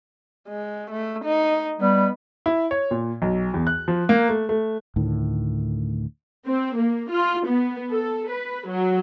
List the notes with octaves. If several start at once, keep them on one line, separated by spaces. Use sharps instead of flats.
G#3
A3
D#4
G3 B3
E4
C#5
A#2
B1
E2
F#6
F3
A#3
A3
A3
D2 A2 D#3
C4
A#3
F4
B3
A4
B4
F#3